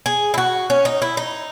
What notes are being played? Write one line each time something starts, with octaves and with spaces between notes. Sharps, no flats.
G#4
E4
F#4
C#4
D#4
E4
D#4